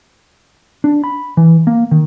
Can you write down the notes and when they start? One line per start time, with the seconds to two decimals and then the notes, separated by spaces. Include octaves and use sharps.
0.84 D4
1.04 B5
1.37 E3
1.67 A#3
1.91 D#3